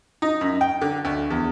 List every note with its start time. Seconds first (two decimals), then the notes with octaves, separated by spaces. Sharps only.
0.22 D#4
0.41 F#2
0.61 G5
0.81 D3
1.05 D2
1.30 E2